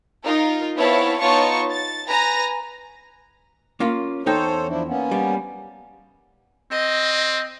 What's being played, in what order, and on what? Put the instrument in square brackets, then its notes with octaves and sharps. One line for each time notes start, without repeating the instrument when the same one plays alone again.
[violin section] D#4 F4 A#4
B3 C4 E4 C#5 F5 A5
B3 D#4 F4 C#5 A5 C#6
A6
B4 G#5 A#5 A#6
[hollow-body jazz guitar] A#3 C#4 F4
[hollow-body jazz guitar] E2 D#4 G5 [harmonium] A4 C5 C#5
[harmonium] F3 D4 E4
A#3 B3 C#4
[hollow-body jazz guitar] G3
[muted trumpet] C4 [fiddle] D#5